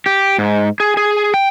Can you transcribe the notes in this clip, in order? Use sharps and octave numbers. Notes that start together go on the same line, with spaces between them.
G4
G#2
G#4
G#4
G5